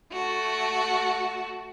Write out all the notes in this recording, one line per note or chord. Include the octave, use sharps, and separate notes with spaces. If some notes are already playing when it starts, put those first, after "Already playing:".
A3 F#4